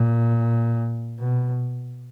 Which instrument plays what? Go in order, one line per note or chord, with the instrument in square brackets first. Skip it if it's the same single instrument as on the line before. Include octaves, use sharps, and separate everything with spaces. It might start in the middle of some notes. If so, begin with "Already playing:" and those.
Already playing: [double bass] A#2
B2